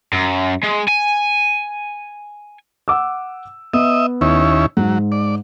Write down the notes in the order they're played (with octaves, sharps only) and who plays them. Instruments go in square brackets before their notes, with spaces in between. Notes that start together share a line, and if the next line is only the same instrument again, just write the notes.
[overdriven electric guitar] F#2
G#3
G#5
[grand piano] F#5 D6 E6
[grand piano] B3 [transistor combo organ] D#5 E5
[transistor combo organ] D#2 C#4 E4
[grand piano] G#2 [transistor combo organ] F#3
[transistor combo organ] D5